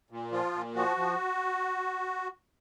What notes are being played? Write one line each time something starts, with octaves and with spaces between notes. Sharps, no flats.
A#2
F3 F4
A#2
F3 F#4
F3